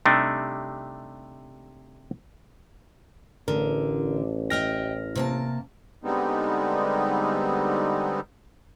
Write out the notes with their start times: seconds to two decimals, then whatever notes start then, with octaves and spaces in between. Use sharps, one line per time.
0.06 C3 G3 A3 D4 D#4
3.48 A1 D3 A#4
4.50 D#5 E5 G5 F6 A#6
5.15 C3 A#3 A5
6.04 D3 G3 G#3 B3 C4 D#4